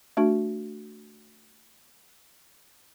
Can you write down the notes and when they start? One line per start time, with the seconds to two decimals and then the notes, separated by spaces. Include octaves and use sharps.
0.17 A3 D4 F#4